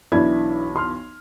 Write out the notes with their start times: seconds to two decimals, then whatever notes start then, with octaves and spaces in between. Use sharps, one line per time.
0.12 B1 E3 D4 E4 B5 G#6
0.76 C6 F6